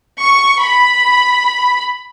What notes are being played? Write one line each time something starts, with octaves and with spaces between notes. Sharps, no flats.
C#6
B5